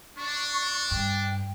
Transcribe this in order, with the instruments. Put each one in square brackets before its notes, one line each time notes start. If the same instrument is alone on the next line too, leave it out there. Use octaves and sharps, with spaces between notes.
[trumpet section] D4 [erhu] C#6
[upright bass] G2 [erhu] G5